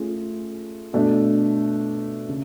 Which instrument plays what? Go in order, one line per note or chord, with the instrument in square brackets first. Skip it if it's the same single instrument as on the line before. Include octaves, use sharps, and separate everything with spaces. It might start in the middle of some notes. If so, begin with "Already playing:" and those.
Already playing: [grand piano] A3 C#4 F4 G#4
B2 A3 D4
C#3